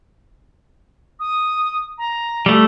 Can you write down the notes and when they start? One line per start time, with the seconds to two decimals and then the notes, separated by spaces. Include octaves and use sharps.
1.19 D#6
1.98 A#5
2.46 G3 A3